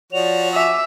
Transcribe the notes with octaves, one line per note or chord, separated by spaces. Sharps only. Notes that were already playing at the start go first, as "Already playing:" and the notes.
F3 F#4 C#5 D5 F7
E5 G#5 D6